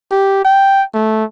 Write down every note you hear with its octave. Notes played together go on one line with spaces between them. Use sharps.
G4
G5
A3